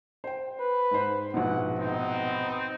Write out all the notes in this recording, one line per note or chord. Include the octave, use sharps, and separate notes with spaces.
C5 G5
B4
G#2 C5
A#1 G#2 B2 F#5
B3 C4 D#4